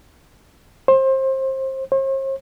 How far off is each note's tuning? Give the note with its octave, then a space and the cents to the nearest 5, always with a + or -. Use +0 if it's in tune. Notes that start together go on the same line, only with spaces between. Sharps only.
C5 +25
C5 +45